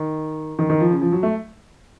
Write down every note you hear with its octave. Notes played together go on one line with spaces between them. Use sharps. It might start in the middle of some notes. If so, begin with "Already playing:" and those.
Already playing: D#3
D#3
D#3
F3
C#3
F3
F#3
A3